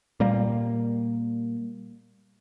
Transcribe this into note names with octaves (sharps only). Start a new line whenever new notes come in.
A#2 G3 A#3